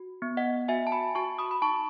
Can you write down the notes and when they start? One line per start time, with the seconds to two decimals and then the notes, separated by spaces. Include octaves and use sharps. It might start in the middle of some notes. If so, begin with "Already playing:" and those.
Already playing: F#4
0.22 B3
0.37 D#5 F#5
0.68 F#4 E5 G#5
0.87 A5
0.92 G#5 B5
1.15 F#4 A5 C#6
1.39 B5 D#6
1.51 B5
1.62 D#4 A5 C#6